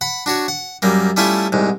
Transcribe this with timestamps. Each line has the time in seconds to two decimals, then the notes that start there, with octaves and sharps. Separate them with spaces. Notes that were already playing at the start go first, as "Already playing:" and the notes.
0.01 F#5 B5
0.26 D4 F#4 C#5
0.48 F#5
0.82 F#2 G3 A#3
1.17 G3 A3 C#4 E4 F4 E5
1.52 C2 G#2